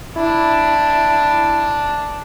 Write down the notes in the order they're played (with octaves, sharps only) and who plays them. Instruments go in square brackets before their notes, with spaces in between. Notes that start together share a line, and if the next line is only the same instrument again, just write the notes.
[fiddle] D4 [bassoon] E4